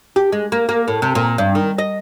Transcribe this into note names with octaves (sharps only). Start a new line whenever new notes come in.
G4
G#3
A#3
A#3
A2
C3
A#2
G2
D#3
D#5